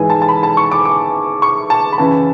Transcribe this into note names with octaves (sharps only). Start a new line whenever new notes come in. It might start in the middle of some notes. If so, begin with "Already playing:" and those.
Already playing: G#2 E3 G#5
A5
A5
B5
A5
C#6
D6
D6
C#6
A5
B5
F#2 C#3 E3 A5